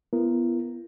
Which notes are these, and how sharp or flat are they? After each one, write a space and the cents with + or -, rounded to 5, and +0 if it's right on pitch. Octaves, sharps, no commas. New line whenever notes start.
B3 +0 E4 +45 A#4 +0